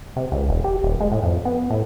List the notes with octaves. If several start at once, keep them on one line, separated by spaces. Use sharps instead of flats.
C3
C#2
E1
G4
D#1
G#3
A2
F2
B3
A2